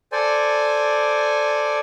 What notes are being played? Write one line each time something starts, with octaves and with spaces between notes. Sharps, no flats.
A4 C5 D5 G#5